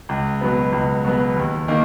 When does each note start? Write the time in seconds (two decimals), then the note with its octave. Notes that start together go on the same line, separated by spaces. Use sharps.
0.09 C#2
0.41 B2 F#3 B3
0.73 C#2
1.05 B2 F#3 B3
1.36 D#2
1.68 D#3 A#3